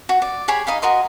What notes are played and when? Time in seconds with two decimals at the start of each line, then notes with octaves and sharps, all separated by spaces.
0.09 F#4
0.22 D5
0.48 G4 G#4 C#5 B5
0.67 D#4 D#5 F5 B5
0.82 F#4 A#4 D#5 C6